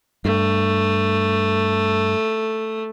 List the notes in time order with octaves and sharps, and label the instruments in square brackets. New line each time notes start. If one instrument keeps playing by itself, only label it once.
[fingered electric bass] G2 [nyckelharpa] A3